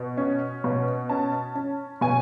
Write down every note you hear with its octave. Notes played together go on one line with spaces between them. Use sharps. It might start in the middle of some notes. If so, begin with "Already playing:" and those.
Already playing: B2
C#4
B2
C#4 A5
C#4
B2 G#5